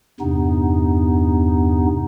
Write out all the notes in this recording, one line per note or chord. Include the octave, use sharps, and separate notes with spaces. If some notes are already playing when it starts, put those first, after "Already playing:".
E2 G2 C3 B3 D#4